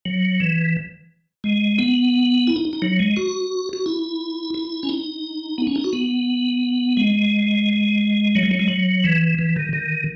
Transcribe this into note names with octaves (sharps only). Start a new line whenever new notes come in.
F#3
E3
G#3
B3
E4
D#4
D#4
F#3
G#3
F#4
F#4
E4
E4
C#4
D#4
B3
C#4
D#4
F#4
B3
G#3
F#3
G#3
F#3
G#3
F#3
E3
E3
D#3
D#3